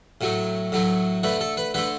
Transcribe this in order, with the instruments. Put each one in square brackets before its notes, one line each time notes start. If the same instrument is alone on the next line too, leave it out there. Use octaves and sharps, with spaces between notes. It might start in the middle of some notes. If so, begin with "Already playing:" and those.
[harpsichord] A2 F#3 A3
A2 F#3 A3
D3 A3 B4
A4
B4
D3 A3 B4